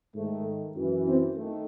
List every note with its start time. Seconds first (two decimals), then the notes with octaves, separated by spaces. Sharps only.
0.15 G#2 D#3 A3
0.75 F#2 E3
1.06 C4
1.35 D#3 A3